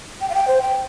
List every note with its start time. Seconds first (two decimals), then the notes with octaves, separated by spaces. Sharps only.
0.21 G5
0.30 F5
0.34 G5
0.48 C5
0.62 G5